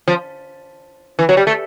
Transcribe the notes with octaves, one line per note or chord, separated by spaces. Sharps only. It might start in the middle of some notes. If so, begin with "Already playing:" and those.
F3
E3
F#3
G3
A3